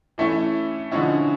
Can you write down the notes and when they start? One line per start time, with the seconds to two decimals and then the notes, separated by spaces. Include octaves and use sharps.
0.18 E3 A3 C#4 E4
0.91 D3 F3 G#3 C#4 E4